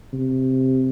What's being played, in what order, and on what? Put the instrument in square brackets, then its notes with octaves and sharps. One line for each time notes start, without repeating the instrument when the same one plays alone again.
[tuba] C3